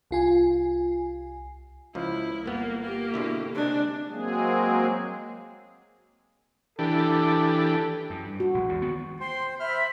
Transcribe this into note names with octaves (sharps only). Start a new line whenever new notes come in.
C2 F4 G#5
C#2 F3 E4
G1 A#3 B3
A#3 G4
B2 D3 E4
C3 G#3 D4
F#3 G#3 A#3 C4 G#4
E3 D4 G4 A4
F#2
G2
F#4
A#1 G#3
E2 G2
D#3 B3
C5 G5 C6
C5 E5 B5 F6